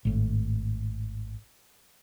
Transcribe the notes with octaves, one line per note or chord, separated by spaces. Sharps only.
G#1 A2